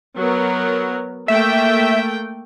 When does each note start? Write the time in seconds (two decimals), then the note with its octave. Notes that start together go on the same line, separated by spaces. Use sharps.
0.16 F#3 B3 A#4
1.28 A3 A#3 E5 G5